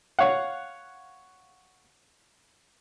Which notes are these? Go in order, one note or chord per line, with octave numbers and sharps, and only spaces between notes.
C#5 F5 F#5